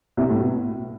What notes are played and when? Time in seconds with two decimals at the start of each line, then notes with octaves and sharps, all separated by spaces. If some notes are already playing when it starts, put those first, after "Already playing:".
0.17 C2 C3
0.29 A2
0.40 B2